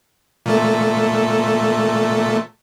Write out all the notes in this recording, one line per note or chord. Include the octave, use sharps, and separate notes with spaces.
A#2 A3 A4